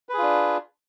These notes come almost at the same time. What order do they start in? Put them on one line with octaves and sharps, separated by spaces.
B4 G#4 F4 D4